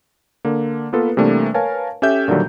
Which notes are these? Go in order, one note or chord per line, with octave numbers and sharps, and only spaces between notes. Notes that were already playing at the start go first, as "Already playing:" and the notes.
D3 A#3
A#3 B3 F4 A4 B4
C3 E3 G3 A3 A#3 D4
A#4 B4 C#5 F5 G#5 A5
C#4 G4 A4 E5 G6
A#2 D3 D#3 F#3 G3